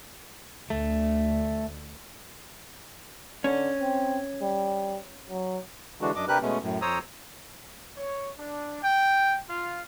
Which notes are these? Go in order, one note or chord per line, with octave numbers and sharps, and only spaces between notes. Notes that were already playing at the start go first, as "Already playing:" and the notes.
D2 A3
D3 C#4
C4
G3
F#3
D3 E3 G#3 D4 F#4
F#2 D4 D#5 D6
C3 D4 G4 A#4 B4 F#6
B2 G#3 A3 B3 C#4
F#2 A2
F2 C5 C#5 A#5 D#6 E6
C#5
D4
G5
F4